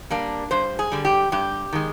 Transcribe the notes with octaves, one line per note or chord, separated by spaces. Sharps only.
G3 A#3 D4
G2 C5
G#4
D3 G3
G4
G2 G4
D#3 G#3